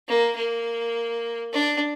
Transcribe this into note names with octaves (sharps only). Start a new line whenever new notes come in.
A#3
A#3
D4